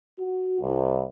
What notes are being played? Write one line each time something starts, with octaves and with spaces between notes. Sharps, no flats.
F#4
C2